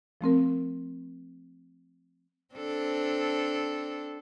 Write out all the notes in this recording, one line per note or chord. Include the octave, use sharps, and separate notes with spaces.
F3 A3 C4 A#4
C4 D4 A4